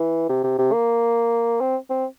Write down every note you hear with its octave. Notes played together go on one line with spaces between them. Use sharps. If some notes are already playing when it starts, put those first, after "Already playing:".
Already playing: E3
C3
C3
C3
A#3
C4
C4